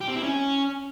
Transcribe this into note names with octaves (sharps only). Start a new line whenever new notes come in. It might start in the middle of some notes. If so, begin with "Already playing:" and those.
G4
C4
E4
C#4